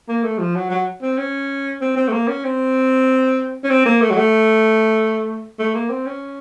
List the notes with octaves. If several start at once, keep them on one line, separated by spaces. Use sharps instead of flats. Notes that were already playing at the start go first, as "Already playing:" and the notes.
A#3
A3
F3
F#3
F#3
C4
C#4
C4
C4
A3
A#3
C#4
C4
C#4
C4
A#3
A3
F#3
A3
A3
A#3
C4
C#4